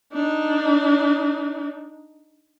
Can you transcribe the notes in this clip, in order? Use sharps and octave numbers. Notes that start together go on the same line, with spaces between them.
D4 D#4